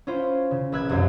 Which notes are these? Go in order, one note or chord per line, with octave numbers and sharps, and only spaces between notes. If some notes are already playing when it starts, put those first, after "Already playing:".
C#4 E4 F4 C5
C#3
A#1 B4 E6 F#6 G#6
F1 C2 F#2